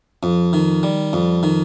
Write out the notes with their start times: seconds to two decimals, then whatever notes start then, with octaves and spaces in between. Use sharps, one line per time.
0.23 F2
0.53 D#3
0.83 G3
1.13 F2
1.43 D#3